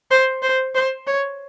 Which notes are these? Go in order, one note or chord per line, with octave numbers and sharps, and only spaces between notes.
C5
C5
C5
C#5